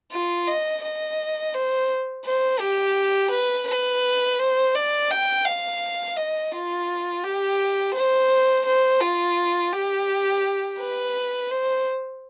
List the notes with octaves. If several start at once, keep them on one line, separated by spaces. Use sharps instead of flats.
F4
D#5
D#5
C5
C5
G4
B4
B4
C5
D5
G5
F5
D#5
F4
G4
C5
C5
F4
G4
B4
C5